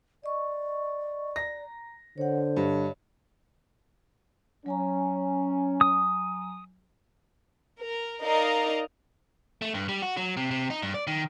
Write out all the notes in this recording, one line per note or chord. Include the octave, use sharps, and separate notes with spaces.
D5 D#5 C#6
A#5 A#6
D3 C5 C#5 F#5
G2 C#5 D#5
F#3 C#4 G#5 A#5
D#6
A#4
D#4 A#4 D5 D#5 F5 A#5
A3
G2
G3
F#4
F#3
C3
C3
D#4
G2
D5
D#3